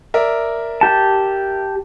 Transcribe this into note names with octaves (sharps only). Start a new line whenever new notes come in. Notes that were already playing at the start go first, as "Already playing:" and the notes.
A#4 D5 E5
G4 A5